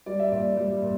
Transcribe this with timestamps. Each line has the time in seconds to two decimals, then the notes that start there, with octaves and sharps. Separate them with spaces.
0.06 G3 D5
0.20 E5
0.31 A#2 D5
0.57 G3
0.82 A#2